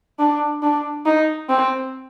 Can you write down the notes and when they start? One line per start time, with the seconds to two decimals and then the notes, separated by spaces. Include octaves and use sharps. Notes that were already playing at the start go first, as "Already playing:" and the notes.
0.19 D4
0.63 D4
1.06 D#4
1.50 C4